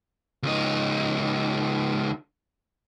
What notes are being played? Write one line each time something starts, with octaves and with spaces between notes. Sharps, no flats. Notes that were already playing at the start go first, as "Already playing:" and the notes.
C#2 D#4